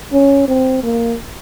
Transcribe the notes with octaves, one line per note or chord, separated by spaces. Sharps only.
C#4
C4
A#3